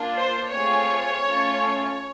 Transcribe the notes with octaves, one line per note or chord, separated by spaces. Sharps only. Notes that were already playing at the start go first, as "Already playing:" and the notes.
Already playing: A#3 D4 F4
C5
A3 C4 F4 G#4 C#5
A3 C#4 F4 A4